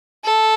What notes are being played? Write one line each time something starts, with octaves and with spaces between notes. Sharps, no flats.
A4